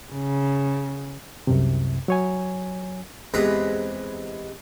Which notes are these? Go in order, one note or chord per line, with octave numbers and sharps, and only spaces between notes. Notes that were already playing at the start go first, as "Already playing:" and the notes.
C#3
C2 F#2 C3
F#3 C#5 G#5
E2 C3 G#3 B4 A#5